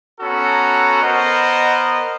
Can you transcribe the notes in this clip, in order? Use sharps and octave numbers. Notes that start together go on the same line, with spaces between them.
B3 C#4 F#4 A4 A#5
B3 A#4 C5 D#5 F#5